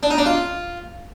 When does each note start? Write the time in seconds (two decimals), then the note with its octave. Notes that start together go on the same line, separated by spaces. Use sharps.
0.03 D4
0.10 D#4
0.18 D4
0.26 F4